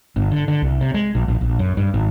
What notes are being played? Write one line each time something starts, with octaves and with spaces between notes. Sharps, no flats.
G1
D3
D3
C2
C3
G#3
A#1
A#1
A#1
F#2
G2
G#1